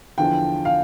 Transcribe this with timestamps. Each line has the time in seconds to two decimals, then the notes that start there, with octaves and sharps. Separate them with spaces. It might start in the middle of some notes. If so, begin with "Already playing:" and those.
0.18 E2 D3 F3 G5
0.65 F5